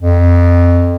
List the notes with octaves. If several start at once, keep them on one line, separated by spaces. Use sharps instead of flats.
F2